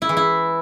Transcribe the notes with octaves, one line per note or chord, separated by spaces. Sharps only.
E4
E3
E4